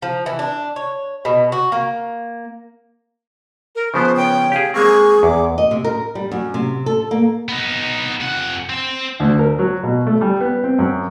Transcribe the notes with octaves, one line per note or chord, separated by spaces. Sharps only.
F3
E3
D4
C#5
B2
F#4
A#3
A#4
C#3 F3 B3 C5
C#5 G5
G4 G#4 F5
G#3 A#3 C4 G#4 C#6
E2 D6
D#5
C3
A#4
G3
F#2
C3
A4
A#3
B3 D#4
F2 F#5
C4 C6
D2
A#4
F#3
B2
A3
G3
B3
C4
F#2